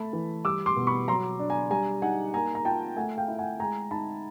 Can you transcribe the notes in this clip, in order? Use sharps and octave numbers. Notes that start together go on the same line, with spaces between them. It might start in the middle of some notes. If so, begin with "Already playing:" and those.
Already playing: A3 A5 B5
E3
G3 D6 E6
C6 D6
B2
B5 C#6
F#3 A#5 C6
D4
G#5 A#5
G3 G#5 A#5
D#4 F#5 G#5
A#3 G#5 A#5
A#5
F4 G5 A5
A3 F#5 G#5
F5 G5
E4
F#5 G#5
G#3 G#5 A#5
D#4 A5 B5